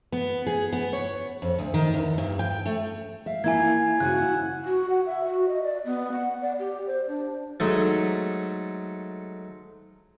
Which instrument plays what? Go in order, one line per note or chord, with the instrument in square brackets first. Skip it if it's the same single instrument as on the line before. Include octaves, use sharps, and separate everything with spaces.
[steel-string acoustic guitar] B3
G#4
B3
C#5
F2
D2
D#3
E2
G2
G5
A3
E5 F5
[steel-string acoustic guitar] A#3 E4 F5 [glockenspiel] G#5 G#6
[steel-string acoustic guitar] C#3 F#4 G#5 [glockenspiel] F#6
[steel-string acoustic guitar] E4 F#5
[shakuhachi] F#4
F#5
E5
F#4
D#5
D5
B3
F#5
D5
G4
C5
D4
[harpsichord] G#2 F#3 A3 A4 C#6 D#6